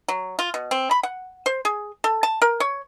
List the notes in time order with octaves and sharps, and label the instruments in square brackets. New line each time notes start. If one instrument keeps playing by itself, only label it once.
[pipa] F#3
F4
B2
C4
B5
F#5
C5
G#4
A4
A5
A#4
C#5